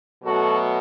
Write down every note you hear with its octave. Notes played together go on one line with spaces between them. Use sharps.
B2 F#3 A3 F#4 A4